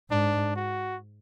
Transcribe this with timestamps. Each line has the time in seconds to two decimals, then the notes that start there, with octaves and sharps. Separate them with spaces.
0.10 G#2 D4
0.56 F#4